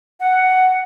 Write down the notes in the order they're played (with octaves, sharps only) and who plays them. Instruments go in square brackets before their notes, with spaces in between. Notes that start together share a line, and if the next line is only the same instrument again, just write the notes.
[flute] F#5